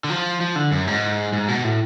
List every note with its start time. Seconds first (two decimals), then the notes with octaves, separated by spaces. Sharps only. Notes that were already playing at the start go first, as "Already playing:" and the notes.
0.04 D3
0.10 F3
0.41 F3
0.56 D3
0.72 F#2
0.87 G#2
1.33 G#2
1.48 B2
1.64 A2